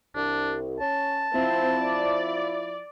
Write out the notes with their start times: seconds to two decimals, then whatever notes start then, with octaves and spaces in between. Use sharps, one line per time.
0.15 C2 D4
0.80 C#4 A5
1.34 F3 C4 E4
1.78 D5